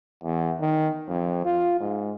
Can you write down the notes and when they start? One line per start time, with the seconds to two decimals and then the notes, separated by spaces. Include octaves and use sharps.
0.24 E2
0.61 D#3
1.08 F2
1.45 F4
1.80 G#2